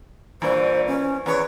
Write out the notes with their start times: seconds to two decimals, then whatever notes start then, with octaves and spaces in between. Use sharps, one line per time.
0.42 G2 A#2 E3 C5
0.87 C#4
1.26 E2 B4 C#5